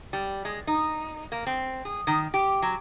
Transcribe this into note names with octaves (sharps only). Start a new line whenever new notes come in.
G3
G#3
D#4
A#3
C4
G#4
D#3
G4
F#3